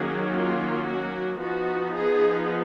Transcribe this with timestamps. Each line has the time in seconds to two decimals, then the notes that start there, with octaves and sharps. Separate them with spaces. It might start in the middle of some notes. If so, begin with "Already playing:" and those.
Already playing: D#3 F#3 A#3 C#4 G#4
0.33 F4
0.86 F#4
1.40 F3 B3 D#4 F#4
1.93 G#4